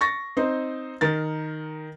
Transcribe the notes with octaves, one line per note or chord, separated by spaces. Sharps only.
C#6 A6 A#6
C4 D#4 C5
D#3 A#4 A6